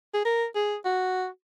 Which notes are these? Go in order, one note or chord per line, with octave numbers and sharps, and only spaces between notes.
G#4
A#4
G#4
F#4